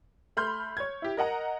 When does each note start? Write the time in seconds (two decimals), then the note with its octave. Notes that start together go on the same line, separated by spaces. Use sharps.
0.37 A3 B5 C6 F6 G6
0.77 C#5 G#6
1.02 E4 G4
1.17 A#4 D#5 F#5 A#5